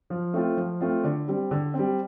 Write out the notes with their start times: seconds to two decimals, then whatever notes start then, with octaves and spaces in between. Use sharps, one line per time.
0.10 F3
0.34 A3 C4 F4
0.57 F3
0.81 A3 C4 F4
1.04 D3
1.28 G3 C4
1.51 D3
1.74 C4
1.79 G3